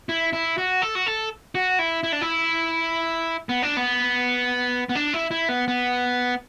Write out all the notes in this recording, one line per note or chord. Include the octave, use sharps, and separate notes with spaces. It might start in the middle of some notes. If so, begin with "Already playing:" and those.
E4
E4
F#4
A4
F#4
A4
F#4
E4
E4
D4
E4
B3
D4
B3
B3
D4
E4
E4
B3
B3